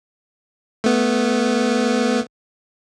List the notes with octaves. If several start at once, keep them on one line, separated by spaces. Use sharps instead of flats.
A3 B3